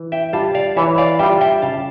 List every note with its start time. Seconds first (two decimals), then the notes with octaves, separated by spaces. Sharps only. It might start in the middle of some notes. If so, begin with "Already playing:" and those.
Already playing: E3
0.12 E5 G5
0.33 G3 D4 F4 F5 A5
0.55 D5 F5
0.76 E3 C#5 E5
0.98 D5 F5
1.19 G3 D4 F4 E5 G5
1.41 E5 G5
1.62 C#3 F5 A5